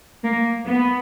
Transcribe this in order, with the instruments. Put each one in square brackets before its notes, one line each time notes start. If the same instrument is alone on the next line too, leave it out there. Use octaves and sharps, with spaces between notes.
[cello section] A#3
B3